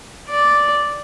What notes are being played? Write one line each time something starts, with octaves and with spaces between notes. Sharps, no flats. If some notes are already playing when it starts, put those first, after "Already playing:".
D5